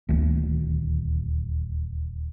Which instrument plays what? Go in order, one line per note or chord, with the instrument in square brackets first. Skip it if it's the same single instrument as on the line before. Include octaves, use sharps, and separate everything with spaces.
[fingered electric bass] D#1 D2